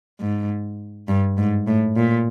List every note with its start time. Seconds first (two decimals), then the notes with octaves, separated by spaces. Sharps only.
0.20 G#2
1.08 G2
1.37 G#2
1.67 A2
1.96 A#2